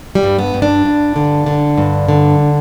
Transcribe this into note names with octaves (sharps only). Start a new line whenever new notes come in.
G3
G2
B3
G2
D4
G2
D3
D3
G2
D3